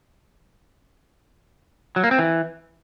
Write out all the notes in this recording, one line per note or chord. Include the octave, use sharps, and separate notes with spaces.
F#3
A#3
C4
E3